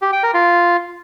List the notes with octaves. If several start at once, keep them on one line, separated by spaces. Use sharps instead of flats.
G4
G5
A#4
F4